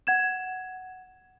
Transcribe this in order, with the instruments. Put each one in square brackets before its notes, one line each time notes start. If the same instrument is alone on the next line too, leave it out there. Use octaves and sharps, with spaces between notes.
[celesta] F#5 G#6 E7